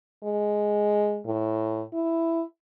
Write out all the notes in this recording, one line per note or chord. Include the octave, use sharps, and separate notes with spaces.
G#3
A2
E4